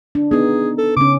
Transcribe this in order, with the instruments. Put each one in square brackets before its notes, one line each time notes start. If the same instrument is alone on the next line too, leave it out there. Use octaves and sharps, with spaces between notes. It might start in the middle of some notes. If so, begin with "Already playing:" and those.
[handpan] D4
[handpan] B3 D#4 [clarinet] G#4
[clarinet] A4
[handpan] C#3 C#4 [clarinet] D6